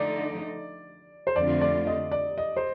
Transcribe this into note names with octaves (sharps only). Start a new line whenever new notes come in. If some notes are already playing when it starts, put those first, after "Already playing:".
Already playing: D3 F3 A3 D#4 D5
C5
F2 D3 A3 C4 F4 D5
D5
D#5
D5
D#5
C5